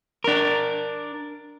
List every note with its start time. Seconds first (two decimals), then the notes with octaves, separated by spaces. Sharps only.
0.24 D4 A#4